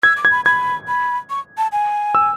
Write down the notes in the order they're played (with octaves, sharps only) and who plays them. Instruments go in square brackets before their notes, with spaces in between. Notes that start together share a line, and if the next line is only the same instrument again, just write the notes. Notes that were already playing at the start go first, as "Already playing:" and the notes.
[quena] E6 [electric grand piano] G#6
[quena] D6
[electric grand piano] G#6
[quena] B5
[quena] B5 [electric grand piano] G#6
[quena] B5
C#6
A5
G#5
[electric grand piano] E6